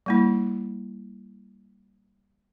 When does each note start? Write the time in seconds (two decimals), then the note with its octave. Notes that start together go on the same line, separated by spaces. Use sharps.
0.06 G3 A#3 E4